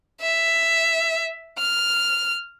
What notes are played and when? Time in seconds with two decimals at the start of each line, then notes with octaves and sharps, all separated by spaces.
0.21 E5
1.58 F6